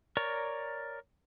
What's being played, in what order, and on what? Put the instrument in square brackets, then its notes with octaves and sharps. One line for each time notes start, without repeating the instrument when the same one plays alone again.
[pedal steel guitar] A#4 C#5 D5 A#5 C#6